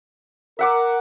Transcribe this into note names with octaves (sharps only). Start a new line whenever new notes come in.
A#4 E5 F#5 D6